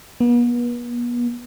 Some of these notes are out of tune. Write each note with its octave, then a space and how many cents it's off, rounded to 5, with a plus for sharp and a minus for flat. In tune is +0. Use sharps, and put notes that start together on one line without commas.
B3 -40